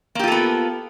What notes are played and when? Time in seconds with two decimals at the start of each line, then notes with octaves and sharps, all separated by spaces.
0.15 A#3
0.19 G4
0.24 F4
0.28 A4
0.32 B3